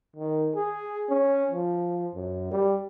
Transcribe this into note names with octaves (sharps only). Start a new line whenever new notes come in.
D#3
G#4
C#4
F3
F#2
G3